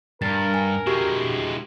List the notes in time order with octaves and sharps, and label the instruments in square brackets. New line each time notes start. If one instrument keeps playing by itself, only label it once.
[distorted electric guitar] G2 [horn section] A#4 [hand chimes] A6
[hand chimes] G#5
[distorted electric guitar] G#3 E4 [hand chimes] F#4 G4 C#6